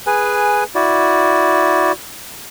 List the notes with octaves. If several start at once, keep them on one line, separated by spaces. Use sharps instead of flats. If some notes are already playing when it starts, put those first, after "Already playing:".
G#4 B4 G#5
E4 F#4 D5